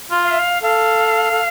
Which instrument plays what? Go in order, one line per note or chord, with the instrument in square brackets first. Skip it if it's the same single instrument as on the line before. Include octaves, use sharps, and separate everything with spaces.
[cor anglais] F4
[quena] F5
E5
F5
[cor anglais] A4 [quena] F5
[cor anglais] A4